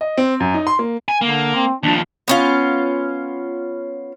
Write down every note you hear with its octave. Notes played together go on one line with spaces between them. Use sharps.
D#5
C4
F#2
D#4
C6
A#3
G#5
D3 A#3
C4
D#2 F3 D4
B3 C#4 F4